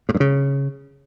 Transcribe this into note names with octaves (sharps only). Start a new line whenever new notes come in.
A2
G2
C#3